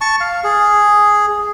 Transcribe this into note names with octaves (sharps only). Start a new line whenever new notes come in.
A5 C#6
F5
G#4